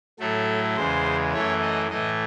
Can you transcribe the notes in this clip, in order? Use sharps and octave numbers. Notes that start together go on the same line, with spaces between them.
A2 F#3 A3 A4
E2 C#3 G#3 C5
F#2 E3 A3 C#5
D#5
A2 E3 A3 D#5